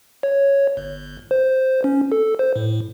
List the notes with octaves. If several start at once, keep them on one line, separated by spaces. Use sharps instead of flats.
C#5
G1
C5
C#4
A4
C5
A2